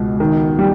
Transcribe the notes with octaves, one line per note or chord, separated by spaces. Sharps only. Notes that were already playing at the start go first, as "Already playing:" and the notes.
Already playing: C#2 B2
D#3
G3